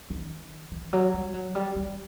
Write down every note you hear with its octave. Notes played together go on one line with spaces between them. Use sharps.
D#3
E3
F#3
G3
F#3
G3
G3